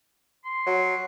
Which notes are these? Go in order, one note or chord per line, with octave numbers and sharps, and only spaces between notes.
C6
F#3